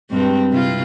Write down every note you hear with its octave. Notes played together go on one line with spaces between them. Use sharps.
G2 G#3 C4
C3 E4 F4